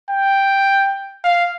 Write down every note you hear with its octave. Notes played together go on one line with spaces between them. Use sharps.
G5
F5